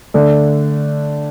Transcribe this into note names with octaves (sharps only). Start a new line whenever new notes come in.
D3 A3 D4